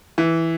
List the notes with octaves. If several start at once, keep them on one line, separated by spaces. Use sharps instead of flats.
E3